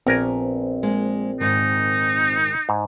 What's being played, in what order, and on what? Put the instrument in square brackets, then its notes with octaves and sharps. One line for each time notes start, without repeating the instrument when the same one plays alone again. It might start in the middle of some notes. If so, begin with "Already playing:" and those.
[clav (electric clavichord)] A#1 A#4 G#5 [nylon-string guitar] B3 [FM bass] C4
[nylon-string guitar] G#3 A#3
[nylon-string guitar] G#2 D#3 [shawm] D#4
[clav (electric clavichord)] G#2